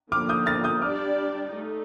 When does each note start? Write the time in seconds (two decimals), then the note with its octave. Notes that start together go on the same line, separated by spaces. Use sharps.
0.11 D3 F3 A#3 D6 F6
0.29 D#6 G6
0.46 F6 A6
0.64 D#6 G6
0.81 G3 D4 G4 D5 D6 F6
1.52 A3 D#4